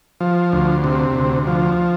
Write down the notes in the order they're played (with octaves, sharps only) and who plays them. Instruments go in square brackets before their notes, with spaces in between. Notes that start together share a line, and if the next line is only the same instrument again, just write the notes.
[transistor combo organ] F3
D2
C3
D2
F3